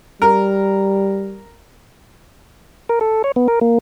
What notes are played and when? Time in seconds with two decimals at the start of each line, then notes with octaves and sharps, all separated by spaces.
0.22 G3 A#4
2.89 A#4
3.01 A4
3.24 C#5
3.36 B3
3.48 A#4
3.61 A#3